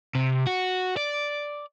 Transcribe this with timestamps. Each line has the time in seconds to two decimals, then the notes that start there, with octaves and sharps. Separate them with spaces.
0.15 C3
0.47 F#4
0.97 D5